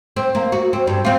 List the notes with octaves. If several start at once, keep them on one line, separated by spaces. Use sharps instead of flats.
C4
A#3
F#4
C4
G2
C4 F4